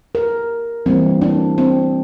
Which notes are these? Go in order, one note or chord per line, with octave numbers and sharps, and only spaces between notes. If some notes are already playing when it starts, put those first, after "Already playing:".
A#4
E3 G3 A#3 C4
D4
C4